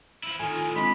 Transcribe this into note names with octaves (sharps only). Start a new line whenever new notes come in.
F3 E4
A2 D#3 D#4 F4 A4 G#5
G#3 C4 D4 B5